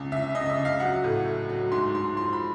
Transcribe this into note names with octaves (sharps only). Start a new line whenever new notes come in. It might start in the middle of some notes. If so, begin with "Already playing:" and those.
Already playing: C#2
C#2 E5
C#2 D#5
D#5
E5
C#2
F5
F#3 F#5
A2
A3
F#3
G#2 C6
G#2 C6
F3 C6
B5